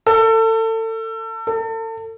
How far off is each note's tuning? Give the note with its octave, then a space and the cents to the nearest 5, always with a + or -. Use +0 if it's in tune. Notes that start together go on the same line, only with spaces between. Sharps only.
A4 +30
A4 +35